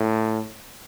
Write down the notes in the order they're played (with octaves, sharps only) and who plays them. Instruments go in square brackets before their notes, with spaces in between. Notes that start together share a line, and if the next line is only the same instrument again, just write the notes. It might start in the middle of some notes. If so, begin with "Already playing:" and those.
Already playing: [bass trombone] A2